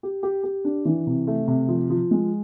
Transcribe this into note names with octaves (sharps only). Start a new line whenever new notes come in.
G4
G4
G4
D4
E3
C3
A3
C3
F3
F3
G#3